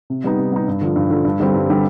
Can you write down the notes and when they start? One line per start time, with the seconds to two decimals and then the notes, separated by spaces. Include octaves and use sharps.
0.10 C3
0.24 G3 B3 D#4
0.38 C3
0.52 G3 B3 D#4
0.68 G2
0.81 D3 F3
0.96 G2
1.10 D3 F3
1.25 G2
1.40 D3 G3 C4 G4
1.54 G2
1.69 D3 G3 C4 G4